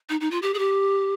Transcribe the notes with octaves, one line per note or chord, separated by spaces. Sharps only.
D#4
D#4
F4
G4
G#4
G4